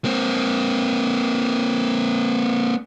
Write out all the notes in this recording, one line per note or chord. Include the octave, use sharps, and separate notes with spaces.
A#3 C4